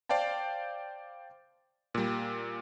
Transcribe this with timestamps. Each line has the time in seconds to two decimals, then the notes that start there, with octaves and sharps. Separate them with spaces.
0.09 C5 D5 F5 G5 A5
1.94 A#2 G3